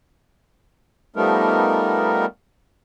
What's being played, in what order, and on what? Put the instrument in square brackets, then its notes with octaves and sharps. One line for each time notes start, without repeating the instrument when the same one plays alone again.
[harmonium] F3 G3 A3 B3 D#4 A#4